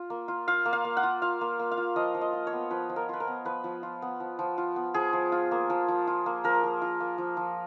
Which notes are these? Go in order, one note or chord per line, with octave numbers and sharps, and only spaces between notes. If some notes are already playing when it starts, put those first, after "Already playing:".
Already playing: F4
A#3
F4
F4 F5
A#3
F5
A#3
F#5
F4
F4 F5
A#3
A#3
F5
F4
F3 D#5
F3
D#5
F4
C#5
B3
F3 B4
F3
A#4
F4 B4
A#4
B3
F3 B4
F3
F4
B3
F3
F3
F4
B3
F3 G#4
F3
F4
A#3
F3
F3
F4
A#3
F3 A#4
F3
F4
A#3
F3
F3